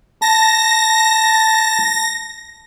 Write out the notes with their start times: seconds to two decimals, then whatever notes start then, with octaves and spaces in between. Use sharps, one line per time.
0.22 A5 A#6